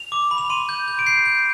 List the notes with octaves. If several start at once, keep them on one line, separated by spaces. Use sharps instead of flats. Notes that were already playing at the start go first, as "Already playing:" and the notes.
Already playing: F7
D6
B5
F7
C6 D#7
G6
G6
D7
G6 C7
G6